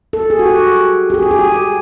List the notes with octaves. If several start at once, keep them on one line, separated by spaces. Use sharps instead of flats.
A4
G#4
F#4
G4
G4
G#4
G4
G#4
G4